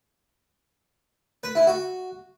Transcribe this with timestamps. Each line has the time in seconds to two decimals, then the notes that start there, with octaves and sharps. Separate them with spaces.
1.44 B4
1.55 E4
1.67 F#4